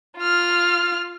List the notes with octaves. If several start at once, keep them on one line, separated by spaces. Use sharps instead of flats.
F4 F6